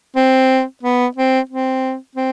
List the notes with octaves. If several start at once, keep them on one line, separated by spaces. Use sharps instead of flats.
C4
B3
C4
C4
C4